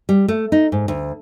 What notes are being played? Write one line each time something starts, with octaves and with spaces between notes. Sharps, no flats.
G3
A3
D#4
G#2
D2